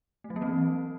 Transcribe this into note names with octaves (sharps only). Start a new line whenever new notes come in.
A3
F#3
A#3
C4
E3